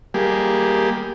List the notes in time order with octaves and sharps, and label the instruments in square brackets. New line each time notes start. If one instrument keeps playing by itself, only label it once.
[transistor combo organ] G3 A#3 G4 G#4